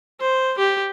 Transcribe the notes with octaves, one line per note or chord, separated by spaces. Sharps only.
C5
G4